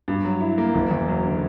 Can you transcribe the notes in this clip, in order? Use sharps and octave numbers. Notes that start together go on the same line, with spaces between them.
G2
F#3
E4
A#3
F#1
E2
F#3
D3